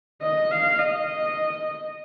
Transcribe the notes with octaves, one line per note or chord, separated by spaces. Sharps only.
D#5
F5
D#5